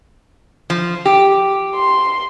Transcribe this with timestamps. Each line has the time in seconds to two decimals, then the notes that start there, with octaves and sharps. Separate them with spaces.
0.70 F3
1.06 G4
1.75 C6